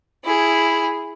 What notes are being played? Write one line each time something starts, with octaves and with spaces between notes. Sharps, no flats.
E4 G#4